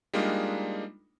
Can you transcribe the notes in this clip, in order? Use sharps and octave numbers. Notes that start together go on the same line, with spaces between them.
G3 G#3 A#3 D4 D#4 F4